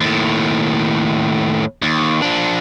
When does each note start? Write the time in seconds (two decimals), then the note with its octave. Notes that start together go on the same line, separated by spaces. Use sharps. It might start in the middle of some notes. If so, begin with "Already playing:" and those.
0.01 D#2 A2
1.82 D#2
2.22 F3 D4